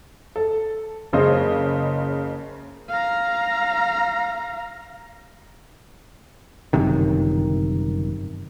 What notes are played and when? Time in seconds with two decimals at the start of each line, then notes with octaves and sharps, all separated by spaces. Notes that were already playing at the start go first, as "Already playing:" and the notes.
0.36 A4
1.13 F#1 C#3 C5 D#5
2.90 F5 A#5
6.73 G1 F#2 C3 D#3